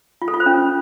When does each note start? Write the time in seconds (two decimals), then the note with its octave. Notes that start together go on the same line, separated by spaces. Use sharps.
0.22 F4
0.28 A4
0.34 F4
0.40 C5
0.46 C#4